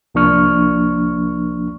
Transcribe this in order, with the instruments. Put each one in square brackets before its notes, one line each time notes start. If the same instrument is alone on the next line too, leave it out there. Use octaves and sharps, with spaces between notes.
[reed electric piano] C2 F3 A#3 D4 C#6 F6